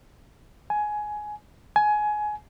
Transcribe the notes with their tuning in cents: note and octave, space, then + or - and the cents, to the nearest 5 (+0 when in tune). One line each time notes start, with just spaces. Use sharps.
G#5 +15
G#5 +20